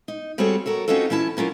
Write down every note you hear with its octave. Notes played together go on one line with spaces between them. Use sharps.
D#4
G3 C4 F#4 G#4 A4 C#5
F#4 A4 A#4 C#5
C4 C#4 D#4 F4 F#4 A4
E3 C#4 E4 A5
F#3 C#4 F4 A#4